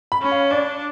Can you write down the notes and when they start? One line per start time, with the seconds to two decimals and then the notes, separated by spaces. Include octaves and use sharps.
0.12 B5
0.22 C#4
0.32 F5
0.51 D4 D5